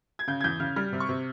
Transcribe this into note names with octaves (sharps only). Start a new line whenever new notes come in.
G#6
C#3 G6
G#6
E2 G6
C#3 F6
G3 F6
C3
C#6
C3